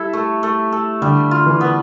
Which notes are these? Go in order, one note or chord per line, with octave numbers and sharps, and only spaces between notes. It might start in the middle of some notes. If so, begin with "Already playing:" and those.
Already playing: G3 E4 A4
A3
A3
A4
D3 G3
F4
E3
B3